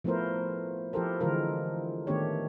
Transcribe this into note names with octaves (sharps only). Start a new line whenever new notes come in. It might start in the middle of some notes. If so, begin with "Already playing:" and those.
F3 A3 B3 E4 A#4 C5
F3 E4 G4 A4 A#4 C5
D3 E3 G#3 F4 A#4
D#3 A3 B3 D4 G4 C#5